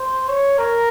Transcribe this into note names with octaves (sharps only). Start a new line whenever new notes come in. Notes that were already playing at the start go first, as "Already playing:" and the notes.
Already playing: C5
C#5
A#4